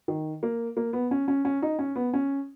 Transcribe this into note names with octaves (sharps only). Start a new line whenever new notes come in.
D#3
A#3
A#3
B3
C#4
C#4
C#4
D#4
C#4
B3
C#4